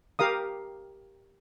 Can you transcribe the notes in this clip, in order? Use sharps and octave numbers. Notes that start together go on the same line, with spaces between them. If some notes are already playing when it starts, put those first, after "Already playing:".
G4 A#4 F5 D#6